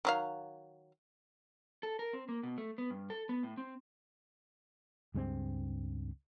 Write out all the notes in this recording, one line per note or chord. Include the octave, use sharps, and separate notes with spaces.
D#3 F#3 F5
A4
A#4
C4
A#3
B2
A3
B3
G2
A4
B3
A2
C4
C#2 G2 G#3 C4